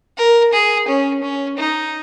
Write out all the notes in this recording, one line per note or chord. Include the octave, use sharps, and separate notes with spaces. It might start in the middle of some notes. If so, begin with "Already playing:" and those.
A#4
G#4
C#4
C#4
D#4